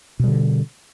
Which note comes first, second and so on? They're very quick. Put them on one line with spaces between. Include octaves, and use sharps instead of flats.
B2 G3 D3